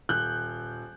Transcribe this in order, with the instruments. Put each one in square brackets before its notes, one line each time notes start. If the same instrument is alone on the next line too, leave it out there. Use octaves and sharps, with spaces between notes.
[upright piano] D#1 F#6 G6